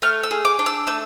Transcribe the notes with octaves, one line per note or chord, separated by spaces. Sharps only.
A3 F6
E6
G#4
D6
D4
E6
A3 E6